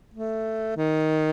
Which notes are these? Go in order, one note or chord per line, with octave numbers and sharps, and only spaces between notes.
A3
D#3